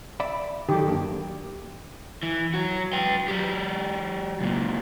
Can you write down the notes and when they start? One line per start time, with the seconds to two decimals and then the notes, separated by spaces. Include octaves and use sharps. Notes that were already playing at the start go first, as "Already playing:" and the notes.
0.20 D5 E5 B5
0.69 D#3 F#3 G4 A4
0.88 F#2 A#3 D4
2.23 E3
2.54 F#3 F#4
2.93 B4 G5
3.28 F#3 G4
4.41 C#2 A#2